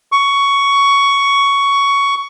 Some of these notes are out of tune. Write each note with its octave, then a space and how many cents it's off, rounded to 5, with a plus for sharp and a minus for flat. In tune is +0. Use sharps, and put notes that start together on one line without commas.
C#6 +10